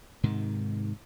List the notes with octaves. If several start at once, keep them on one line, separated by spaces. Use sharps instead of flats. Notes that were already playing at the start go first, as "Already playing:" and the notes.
G#2 C3 D#3